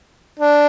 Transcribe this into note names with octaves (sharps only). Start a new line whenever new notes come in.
D4